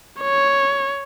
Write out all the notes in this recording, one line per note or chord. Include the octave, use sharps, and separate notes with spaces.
C#5